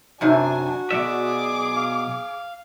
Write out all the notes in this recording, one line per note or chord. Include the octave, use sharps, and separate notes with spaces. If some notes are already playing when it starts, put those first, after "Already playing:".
F#2 C3 D4 D#4 F#4 G#5
B2 F#3 G#4 D5 E5 D6
F5